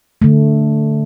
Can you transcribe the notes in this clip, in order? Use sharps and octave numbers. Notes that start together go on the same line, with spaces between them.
D3 A3